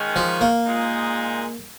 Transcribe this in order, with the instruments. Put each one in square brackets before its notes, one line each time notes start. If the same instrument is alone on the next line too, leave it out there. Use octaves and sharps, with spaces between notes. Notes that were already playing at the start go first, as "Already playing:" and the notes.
Already playing: [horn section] D#3 G#3 C#4
[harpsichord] F3
A#3
[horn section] A#2 G#3 D#4